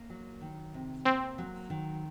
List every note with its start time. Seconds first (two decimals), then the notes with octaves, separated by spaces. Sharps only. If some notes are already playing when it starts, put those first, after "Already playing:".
Already playing: A#3
0.10 F#3
0.41 D#3
0.74 C3
1.05 A#3 C4
1.38 F#3
1.70 D#3